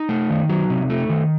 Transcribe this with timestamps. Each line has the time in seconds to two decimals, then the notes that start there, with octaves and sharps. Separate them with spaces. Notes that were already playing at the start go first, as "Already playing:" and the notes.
Already playing: D#4
0.09 A3
0.30 D#3
0.50 F#3
0.70 C3
0.90 A3
1.10 D#3